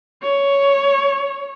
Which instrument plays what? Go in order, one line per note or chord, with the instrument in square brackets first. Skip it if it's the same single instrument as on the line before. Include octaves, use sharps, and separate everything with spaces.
[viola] C#5